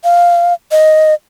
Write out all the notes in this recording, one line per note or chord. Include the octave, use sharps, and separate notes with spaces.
F5
D#5